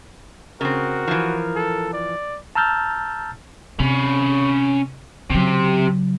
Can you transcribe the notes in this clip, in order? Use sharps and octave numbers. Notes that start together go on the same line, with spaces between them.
C#3 C4 F#4 A#4
E3 F3
A4
D5
A5 A#5 E6 F6 G6 A6
C3 C#4 B5
C#3 F#3 C4 G4